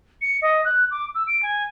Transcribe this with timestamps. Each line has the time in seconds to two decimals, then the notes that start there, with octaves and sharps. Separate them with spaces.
0.22 C#7
0.42 D#5
0.65 F#6
0.91 D6
1.15 E6
1.27 D7
1.43 G#5